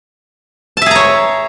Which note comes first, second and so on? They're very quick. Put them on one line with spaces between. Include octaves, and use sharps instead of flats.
A5 E5 G#4 A#5 C#5